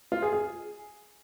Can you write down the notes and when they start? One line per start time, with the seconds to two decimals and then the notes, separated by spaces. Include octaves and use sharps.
0.12 F4
0.23 G#4
0.33 G#4